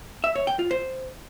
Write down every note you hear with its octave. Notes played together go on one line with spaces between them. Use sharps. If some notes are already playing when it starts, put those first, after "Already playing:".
E5
C#5
G5
F4
C5